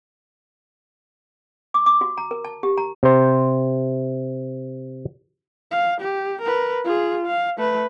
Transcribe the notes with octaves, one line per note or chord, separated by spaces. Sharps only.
D6
D6
F#4
A#5
A#4
A5
G4
A#5
C3 C5
F5
G4
A#4 B4
F4 G#4
F5
A3 B4